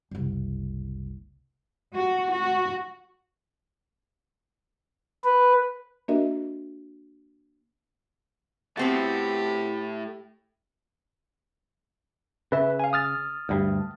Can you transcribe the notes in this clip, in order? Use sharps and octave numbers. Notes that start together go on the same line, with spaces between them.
F#1 C2
F#4
F#4
B4
A#3 D4 F#4 A#4 D#5 E5
A2 A3 B3 C4 F#4 G4
C#3 B4 E5
F5 G#5
D#6 F6 A6
D2 G2